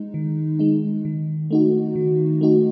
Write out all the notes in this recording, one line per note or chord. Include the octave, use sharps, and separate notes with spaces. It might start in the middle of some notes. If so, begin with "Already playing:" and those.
Already playing: G#3 D#4
D#3
G#3 D#4
D#3
A3 D#4 F#4
D#3
A3 D#4 F#4